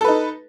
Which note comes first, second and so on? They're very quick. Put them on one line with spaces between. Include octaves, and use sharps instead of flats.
A4 B4 D#4